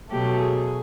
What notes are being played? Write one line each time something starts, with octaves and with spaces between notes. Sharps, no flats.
B2 F#3 A3 G4
G#4